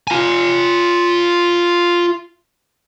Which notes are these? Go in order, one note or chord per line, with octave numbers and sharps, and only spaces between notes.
F4 G#5